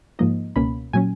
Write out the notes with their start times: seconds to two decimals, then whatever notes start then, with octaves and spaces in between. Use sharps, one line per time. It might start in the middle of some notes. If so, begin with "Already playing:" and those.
0.19 G#2 F3 A#3 D#4 D#5
0.56 C#2 B2 A#3 C#4 B5
0.93 A#2 F#3 C#4 G#5